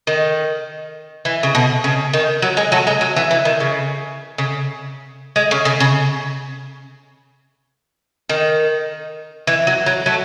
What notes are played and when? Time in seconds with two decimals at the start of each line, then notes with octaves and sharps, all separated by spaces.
0.07 D#3
1.25 E3
1.43 C#3
1.55 B2
1.84 C#3
2.13 D#3
2.42 F#3
2.57 G#3
2.72 F#3 A3
2.87 G#3
3.01 F#3
3.16 E3
3.31 E3
3.45 D#3
3.60 C#3
4.38 C#3
5.36 G#3
5.51 C#3
5.65 C#3
5.80 C#3
8.29 D#3
9.47 E3
9.67 F#3
9.86 F#3
10.06 F#3 A3